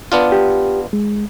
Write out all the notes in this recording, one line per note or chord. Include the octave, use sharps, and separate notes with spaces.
B3 D4 F4
G4
G#3